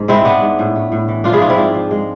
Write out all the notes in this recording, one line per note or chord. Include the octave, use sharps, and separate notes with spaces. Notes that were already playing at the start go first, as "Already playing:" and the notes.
Already playing: G#2
G#3 C4 E4
G#3 B3 D4
G#2
A2
A3
A2
E3
F3 D4 F4
E4 G#4
G#2 D4 F4
C4 E4
G#2 D4 F4
F3
G#3